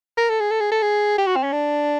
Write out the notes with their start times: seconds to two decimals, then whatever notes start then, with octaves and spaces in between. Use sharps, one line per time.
0.18 A#4
0.30 A4
0.40 G#4
0.51 A4
0.61 G#4
0.72 A4
0.82 G#4
1.18 G4
1.27 F#4
1.36 C4
1.43 C#4
1.52 D4